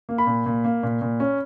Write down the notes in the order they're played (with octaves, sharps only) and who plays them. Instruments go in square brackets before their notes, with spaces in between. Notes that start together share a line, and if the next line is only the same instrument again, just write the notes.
[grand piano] A#3
B5
A#2
A#2
A#3
A#2
A#2
C#4